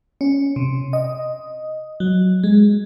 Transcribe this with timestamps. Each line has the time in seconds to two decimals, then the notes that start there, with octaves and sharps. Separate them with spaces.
0.21 C#4
0.56 C3
0.93 D#5
2.00 F#3
2.44 G#3